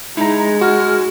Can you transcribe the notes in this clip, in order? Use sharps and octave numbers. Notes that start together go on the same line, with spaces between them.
G#3 D#4 E4 A#5
F#4 F6